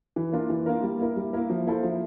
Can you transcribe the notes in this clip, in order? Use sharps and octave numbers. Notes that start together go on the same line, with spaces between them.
E3
A#3 D4 F4 A#4
E3
A#3 D4 F4 A#4
G3
A#3 E4 A#4
G3
A#3 E4 A#4
F3
A#3 E4 A4 C5
F3